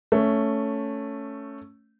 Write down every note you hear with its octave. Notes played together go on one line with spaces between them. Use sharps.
A3 C#4